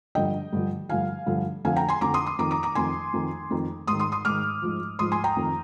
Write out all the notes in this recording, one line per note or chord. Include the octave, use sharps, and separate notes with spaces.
G2 D3 F3 D#5 G5
G2 D3 F3
G2 D3 F3 F5 G#5
G2 D3 F3
F2 D3 F3 F5 G#5
G5 A#5
G#5 C6
F2 D3 F3 A#5 D6
C6 D#6
C6 D#6
F2 D#3 A#5 D6
A#5 D6
A#5 D6
F2 D#3 G#5 C6
F2 D#3
F2 D#3
G#2 C6 D#6
D#3
C6 D#6
C6 D#6
G#2 D#3 D6 F6
G#2 F3
G#2 F3 C6 D#6
G#5 C6
G5 A#5
F2 D#3